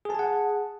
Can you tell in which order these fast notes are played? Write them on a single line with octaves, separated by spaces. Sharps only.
G#4 A5 G#5 F#5